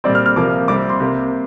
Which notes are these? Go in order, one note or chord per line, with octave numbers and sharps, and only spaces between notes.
A#2 G3 C4 D5
F6
F6
C3 F3 A#3 D6
C3 G3 C4 D6
C6
C3 A#3